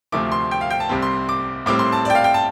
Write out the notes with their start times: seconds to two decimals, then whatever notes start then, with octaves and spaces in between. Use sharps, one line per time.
0.12 D2 C3 F3 A3 C4 D6
0.32 C6
0.51 G5
0.61 F5
0.71 G5
0.80 A5
0.89 C2 C3 G3 C4
1.02 C6
1.29 D6
1.66 A2 G3 C4 D6
1.79 C6
1.92 A5
2.05 D5
2.10 G5
2.15 F5
2.24 G5
2.34 A5